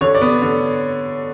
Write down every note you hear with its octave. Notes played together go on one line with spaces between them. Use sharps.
D3 C#5
D5
B3
D3